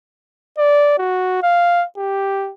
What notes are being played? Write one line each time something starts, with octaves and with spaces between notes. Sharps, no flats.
D5
F#4
F5
G4